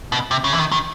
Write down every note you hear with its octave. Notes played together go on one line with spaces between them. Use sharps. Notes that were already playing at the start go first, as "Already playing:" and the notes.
B2
C3
C#3
E3
D#3
D#3